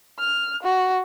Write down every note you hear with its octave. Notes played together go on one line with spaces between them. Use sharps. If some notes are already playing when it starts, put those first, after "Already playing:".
F6
F#4